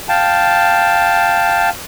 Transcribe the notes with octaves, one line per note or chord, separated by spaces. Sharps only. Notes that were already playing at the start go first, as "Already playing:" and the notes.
F5 G5 A5